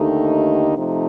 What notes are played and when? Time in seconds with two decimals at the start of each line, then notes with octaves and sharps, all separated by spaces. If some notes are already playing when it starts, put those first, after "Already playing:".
Already playing: D#2 D3 A3 D#4 G4
0.78 C3 F3 A3 D#4